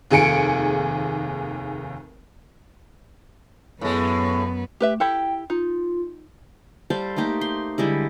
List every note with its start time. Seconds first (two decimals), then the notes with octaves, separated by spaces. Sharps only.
0.11 F1 D#2 G#4 G#5 C#7 D7
3.81 F#2 A2 G#3 B3
4.80 A3 G4 B4 E5
5.00 E4 G4 A4 G5
5.50 D#4 F4
6.90 G3 A4 C5 F5
7.16 A3 A#3 D#4 G4
7.41 C6
7.78 D3 G3 G#3 E4